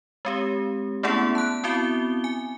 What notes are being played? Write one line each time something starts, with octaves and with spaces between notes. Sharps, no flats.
G#3 C4 G4
A3 B3 C#4 E4 G#4 F#5
A5 F#6
B3 C4 E4 F#4 G7
G#5